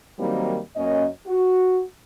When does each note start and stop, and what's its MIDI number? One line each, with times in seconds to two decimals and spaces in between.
0.19 0.59 51
0.19 0.59 54
0.19 0.59 55
0.19 0.59 58
0.19 0.59 60
0.19 0.59 63
0.76 1.07 42
0.76 1.07 58
0.76 1.07 61
0.76 1.07 75
1.26 1.82 66